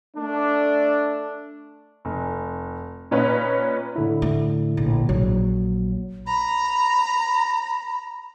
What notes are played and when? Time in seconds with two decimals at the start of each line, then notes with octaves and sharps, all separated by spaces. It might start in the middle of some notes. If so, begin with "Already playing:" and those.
0.16 A3 D4
2.05 F1
3.11 A#2 C#4 B4 C#5 D#5
3.96 A2 D3 E4
4.22 A3
4.77 A#1
5.09 A#1 F#3
6.27 A#5 B5